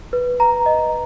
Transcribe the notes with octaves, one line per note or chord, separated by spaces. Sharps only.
B4
A#5
D#5